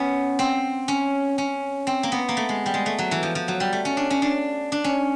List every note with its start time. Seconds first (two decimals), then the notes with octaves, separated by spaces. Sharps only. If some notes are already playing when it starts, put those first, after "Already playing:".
Already playing: B3 C#4
0.39 C4
0.88 C#4
1.38 C#4
1.87 C4
2.03 A#3
2.12 B3
2.29 A#3
2.37 A3
2.49 G#3
2.66 G3
2.74 G#3
2.86 A3
2.99 F#3
3.11 E3
3.23 F3
3.35 F3
3.48 F#3
3.60 G3
3.73 A3
3.85 C#4
3.97 D4
4.10 C#4
4.22 D4
4.72 D4
4.84 C#4